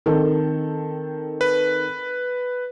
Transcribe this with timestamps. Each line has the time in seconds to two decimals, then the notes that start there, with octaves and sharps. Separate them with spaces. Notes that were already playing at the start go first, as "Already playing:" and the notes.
0.06 D#3 C4 A4
1.41 B4